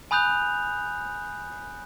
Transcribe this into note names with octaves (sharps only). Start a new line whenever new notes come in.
G#5 B5 D#6 F#6 G6 F7